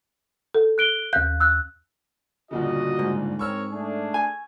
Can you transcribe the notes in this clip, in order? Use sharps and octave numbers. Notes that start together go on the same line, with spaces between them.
A4
F#6 D7 G7
D#2 F5 F#6 G6
E6 F#6
G1 A#2 C#3 F#4 D#5
G#2
C4 A#4 C#5 C#6 E6 F6
A3 D4 G#4
G#5